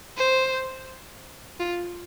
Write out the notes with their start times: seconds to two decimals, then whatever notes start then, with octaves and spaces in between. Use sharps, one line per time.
0.18 C5
1.60 F4